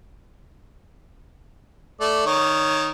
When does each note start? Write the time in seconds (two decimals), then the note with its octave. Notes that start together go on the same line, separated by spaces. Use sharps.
2.00 A3 D5
2.26 D#3 C#5